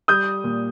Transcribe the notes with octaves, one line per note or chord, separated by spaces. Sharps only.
G3 D#6 G6
A#2